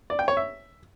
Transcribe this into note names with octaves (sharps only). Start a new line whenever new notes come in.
D5
G5
C#5
E5